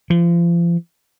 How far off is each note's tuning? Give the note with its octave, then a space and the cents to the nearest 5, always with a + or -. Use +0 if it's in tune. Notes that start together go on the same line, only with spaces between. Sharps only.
F3 -35